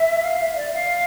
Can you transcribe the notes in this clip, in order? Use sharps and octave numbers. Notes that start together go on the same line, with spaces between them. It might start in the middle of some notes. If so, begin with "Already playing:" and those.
Already playing: E5
F5
E5
D5
F5